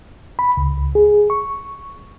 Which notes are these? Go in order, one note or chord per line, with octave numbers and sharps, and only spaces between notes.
B5
C#2
G#4
C#6